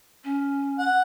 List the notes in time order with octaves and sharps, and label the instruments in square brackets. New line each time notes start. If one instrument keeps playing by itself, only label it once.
[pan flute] C#4
[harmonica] F#5